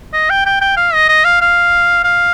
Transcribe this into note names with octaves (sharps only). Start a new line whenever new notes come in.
D#5
G5
G5
G5
F5
D#5
D#5
F5
F5
F5